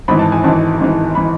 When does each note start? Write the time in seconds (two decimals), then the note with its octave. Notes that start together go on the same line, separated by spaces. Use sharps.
0.08 G#1 G#2 E3 B5
0.19 A5
0.32 G#5
0.44 G#1 G#2 E3 A5
0.80 G#1 G#2 E3
1.15 E3 B5